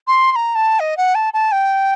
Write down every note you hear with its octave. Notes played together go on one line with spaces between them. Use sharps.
C6
C6
A#5
A5
D#5
F#5
A5
A5
G5